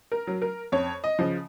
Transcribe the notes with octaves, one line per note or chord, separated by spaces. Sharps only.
A#4
F#3
A#4
F2 C#5
D#5
C#3 F3